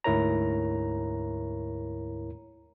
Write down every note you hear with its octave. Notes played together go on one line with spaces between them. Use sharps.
D2 G#2 E4 A#4 C#5 A#5